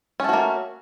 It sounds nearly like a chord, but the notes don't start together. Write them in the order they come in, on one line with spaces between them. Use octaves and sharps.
C#4 A3 F#4 A#3